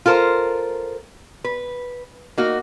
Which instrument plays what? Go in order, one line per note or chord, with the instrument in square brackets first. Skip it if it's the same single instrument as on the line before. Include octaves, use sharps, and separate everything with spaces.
[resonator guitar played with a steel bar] F4 A4 A#4 C5
B4
A#3 D#4 F#4